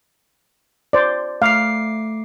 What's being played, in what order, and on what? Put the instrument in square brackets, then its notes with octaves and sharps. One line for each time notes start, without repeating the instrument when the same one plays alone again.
[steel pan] C5 D5
[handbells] A3 D6 C7 [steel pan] F5